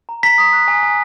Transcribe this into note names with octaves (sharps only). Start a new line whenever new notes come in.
A#5
A#5 B6
D#6
F#6
G#5
G#5